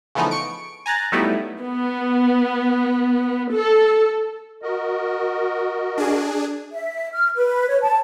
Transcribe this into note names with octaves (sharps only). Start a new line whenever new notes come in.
C#3 E3 F3 A3 B3 D#4
C#6 C#7 D7
G#5 A#5 F#6 A6
F#3 G3 A3 B3 D#4 E4
B3
A4
F#4 A#4 D#5
D4 G#4
E5
F6
B4
C#5
A5